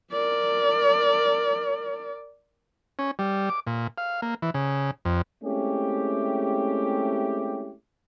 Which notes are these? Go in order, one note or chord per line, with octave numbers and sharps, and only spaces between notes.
A#4 D5
C#4
G3
D6
A#2
F5
A#3
E3
C#3
F2
G#3 A3 C4 C#4 E4 G4